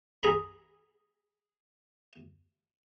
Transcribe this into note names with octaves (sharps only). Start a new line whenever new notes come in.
G#4 A#5 B5